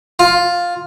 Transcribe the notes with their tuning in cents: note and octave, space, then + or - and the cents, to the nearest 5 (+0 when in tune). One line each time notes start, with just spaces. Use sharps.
F4 +10